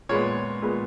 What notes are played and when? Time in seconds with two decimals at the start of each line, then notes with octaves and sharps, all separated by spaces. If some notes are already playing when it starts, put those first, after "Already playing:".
0.09 A#2 G#3 B3 C#5
0.62 A#2 G#3 B3